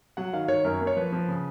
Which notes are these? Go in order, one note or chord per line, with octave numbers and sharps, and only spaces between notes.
F#3 F#5
D#3 F5
D#3 C#5
F#2 A#4
A#3
C#5
F3 B4
F3
C#3